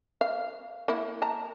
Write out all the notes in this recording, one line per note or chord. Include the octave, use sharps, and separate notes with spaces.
F5
A#3 E4
A5 A#5